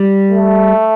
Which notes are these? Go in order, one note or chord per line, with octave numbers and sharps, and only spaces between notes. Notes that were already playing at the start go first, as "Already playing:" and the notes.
Already playing: G3
A3